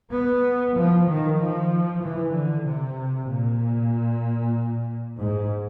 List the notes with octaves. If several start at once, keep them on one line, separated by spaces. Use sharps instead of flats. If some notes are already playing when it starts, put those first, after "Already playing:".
B3
F3
D#3
F3
E3
D3
C3
A#2
G#2